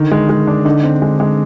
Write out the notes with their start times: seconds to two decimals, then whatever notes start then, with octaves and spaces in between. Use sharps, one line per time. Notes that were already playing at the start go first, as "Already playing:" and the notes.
Already playing: D3 D#3
0.11 G#3
0.29 G#3
0.47 D4
0.65 D3 D#4
0.83 C4
1.02 G#3
1.20 G#3